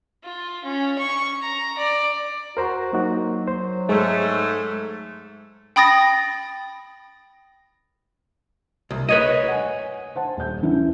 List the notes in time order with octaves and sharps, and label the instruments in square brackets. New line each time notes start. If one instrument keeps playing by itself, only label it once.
[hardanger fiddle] F4
C#4
C#6
A#5
D5
[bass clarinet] F#4 [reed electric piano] A#4 C5 A#5
[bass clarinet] F#3 [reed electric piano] A#3 D#4 F#4
[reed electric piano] C5
[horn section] G#2 A3 [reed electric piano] G#3
[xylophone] G5 B5 D#6 A6 A#6
[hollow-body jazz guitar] C2
B4 C#5 D#5
[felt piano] F#5 G#5
C5 F#5 A5
D#1 G3 G6
E3 C#4 E4